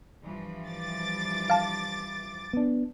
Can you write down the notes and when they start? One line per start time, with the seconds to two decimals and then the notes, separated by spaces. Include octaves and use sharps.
0.23 G2 E3 F3
0.69 D6 A6
1.50 F5 A5
2.53 B3 D4